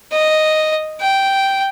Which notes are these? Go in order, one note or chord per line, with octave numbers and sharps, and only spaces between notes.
D#5
G5